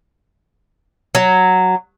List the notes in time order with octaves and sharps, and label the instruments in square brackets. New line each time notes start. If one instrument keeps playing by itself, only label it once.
[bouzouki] F#3